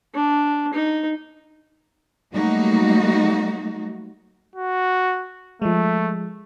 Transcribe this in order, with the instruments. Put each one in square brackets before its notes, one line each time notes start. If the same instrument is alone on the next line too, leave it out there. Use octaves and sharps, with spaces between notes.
[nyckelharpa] D4
D#4
[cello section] F#3 G3 A3 A#3 D#4 F#4
[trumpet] F#4
[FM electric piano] F3 G#3 [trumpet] A3